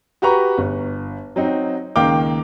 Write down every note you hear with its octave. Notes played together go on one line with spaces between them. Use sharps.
F#4 G4 B4 A#5 C#6
G1
F#3 C4 D#4
C#2 D#3 A#3 F5 G5 D6